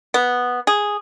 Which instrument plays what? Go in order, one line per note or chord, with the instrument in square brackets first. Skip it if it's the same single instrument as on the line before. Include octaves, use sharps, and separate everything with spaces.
[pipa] B3
G#4